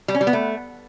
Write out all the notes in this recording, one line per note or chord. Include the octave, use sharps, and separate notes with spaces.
G3
C#4
G3
B3
A3